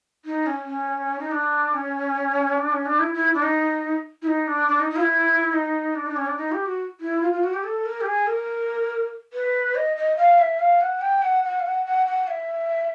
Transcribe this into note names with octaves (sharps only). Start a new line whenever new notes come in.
D#4
C#4
C#4
D#4
D4
C#4
D4
C#4
D4
E4
E4
D4
D#4
E4
D#4
D4
D4
D#4
D#4
F4
E4
D#4
D4
D#4
D4
C#4
D4
D#4
G4
F#4
E4
F4
F4
F#4
G4
A4
A#4
G4
G#4
A#4
B4
D#5
D#5
F5
E5
F5
F#5
G5
F#5
F#5
F5
F#5
F#5
F#5
E5